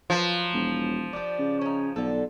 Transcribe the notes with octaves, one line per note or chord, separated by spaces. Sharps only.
F3 F#3 F4 B4
E1
D4 G4
C#3
C#4 D#4
B1 D3 A4